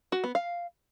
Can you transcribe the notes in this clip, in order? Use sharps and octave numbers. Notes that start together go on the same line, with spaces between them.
F#4
B3
F5